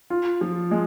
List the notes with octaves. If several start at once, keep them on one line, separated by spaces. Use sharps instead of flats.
F4
F3
G#3